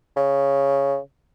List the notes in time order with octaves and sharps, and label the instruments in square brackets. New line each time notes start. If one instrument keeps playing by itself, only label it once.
[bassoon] C#3